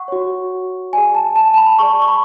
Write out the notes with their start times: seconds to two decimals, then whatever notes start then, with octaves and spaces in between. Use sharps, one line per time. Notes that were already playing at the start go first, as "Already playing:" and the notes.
Already playing: F#5 C#6
0.08 F#4 C#5
0.93 G#4 D5 G#5
1.15 A5
1.36 A5
1.54 A5
1.57 B5
1.79 G#4 D5 C#6
2.02 C#6
2.08 B5